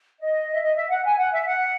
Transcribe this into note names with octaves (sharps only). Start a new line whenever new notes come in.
D#5
E5
D#5
E5
F#5
G#5
F#5
E5
F#5